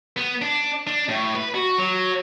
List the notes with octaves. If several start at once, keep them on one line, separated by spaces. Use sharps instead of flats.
B3
D4
D4
A2
B4
F#4
F#3